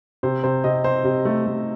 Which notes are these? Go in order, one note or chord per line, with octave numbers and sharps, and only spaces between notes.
C3 C5
C3 C5
C3 D#5
C4 C5
C3
A3
A3